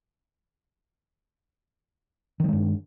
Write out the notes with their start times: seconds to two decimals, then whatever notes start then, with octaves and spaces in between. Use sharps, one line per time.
2.40 D#3
2.44 F3
2.48 G#3
2.53 G2